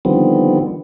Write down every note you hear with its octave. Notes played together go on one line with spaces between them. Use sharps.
D3 D#3 F3 G3 B3 C4